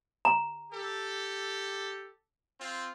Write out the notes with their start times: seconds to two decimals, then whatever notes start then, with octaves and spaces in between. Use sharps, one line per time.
0.25 A#5
0.72 G4 A4
2.59 C4 F4